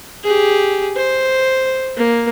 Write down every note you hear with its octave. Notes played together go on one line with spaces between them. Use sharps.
G4 G#4
C5
A#3